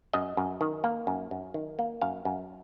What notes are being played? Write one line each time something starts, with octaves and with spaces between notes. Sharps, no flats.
F#2 D#5
F#2
D#3
A#3
F#2
F#2
D#3
A#3
F#2 F5
F#2